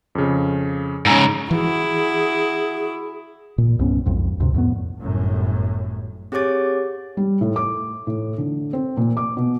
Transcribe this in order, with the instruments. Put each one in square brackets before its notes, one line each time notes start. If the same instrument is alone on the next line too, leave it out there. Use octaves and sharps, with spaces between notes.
[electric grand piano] F2 C#3
[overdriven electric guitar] G#2 C#3 [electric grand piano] G#5 A#5 E6
[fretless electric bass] E3 [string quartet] E4 F#4 [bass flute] G#4
[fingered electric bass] A#2
C2 G2 B3 C#4
B1 F2 G#2
D2 G2 C3
F2 A2 E3 B3
[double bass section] G1 F#2 A2
[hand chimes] C4 G4 G#4 C#5 D6 A6
[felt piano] G3
A2
D6
A2
D3
C4
A#2
D6
B2